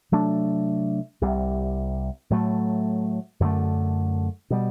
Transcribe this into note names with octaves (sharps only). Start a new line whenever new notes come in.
C3 F#3 A3 D4
C2 C3 G3
A2 F#3 A3
F#2 D3 A3
B2 G3